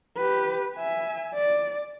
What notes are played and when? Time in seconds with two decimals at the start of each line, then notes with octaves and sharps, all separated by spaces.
0.17 G4 B4
0.77 E5 G#5
1.34 D5